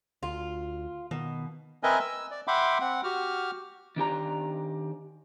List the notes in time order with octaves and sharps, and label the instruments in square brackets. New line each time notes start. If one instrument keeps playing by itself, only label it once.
[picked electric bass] D2 [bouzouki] F4
[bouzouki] B2 [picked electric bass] D#3
[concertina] C4 A#4 B4 D#5 E5 G#5
E6
D5
E5 F#5 G5 B5 C6 D6
C4 F#5
F#4 G4 F6
[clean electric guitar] D#3 D4 G4 A#5